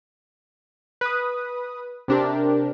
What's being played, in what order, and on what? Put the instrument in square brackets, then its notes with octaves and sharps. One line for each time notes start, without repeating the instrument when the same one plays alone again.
[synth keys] B4 D#6
C3 C4 D4 G4 A#4